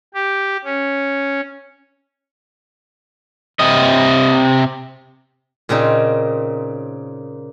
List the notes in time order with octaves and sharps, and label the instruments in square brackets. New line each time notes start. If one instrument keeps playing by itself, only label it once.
[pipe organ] G4
C#4
[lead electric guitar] C3 D#5
[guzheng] A#2 C#3 C4 D#4